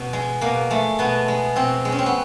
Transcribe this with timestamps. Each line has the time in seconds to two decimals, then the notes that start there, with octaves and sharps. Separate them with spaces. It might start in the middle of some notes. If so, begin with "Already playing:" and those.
Already playing: B2
0.13 G#3
0.41 B2 A#3
0.71 G#3 A3
0.99 B2 B3
1.28 G#3
1.56 B2 C4
1.85 G#3
1.92 C#4
1.99 C4
2.06 B3